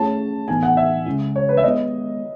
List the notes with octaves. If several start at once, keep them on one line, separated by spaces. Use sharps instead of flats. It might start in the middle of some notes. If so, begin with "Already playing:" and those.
Already playing: A3 C#4 E4 G#4 C#5 A5
A2 E3 B3 D#4 G#5
F#5
E5
C#3 G#3 C#4 E4
C#5
B4
E5
G#3 B3 E4 D#5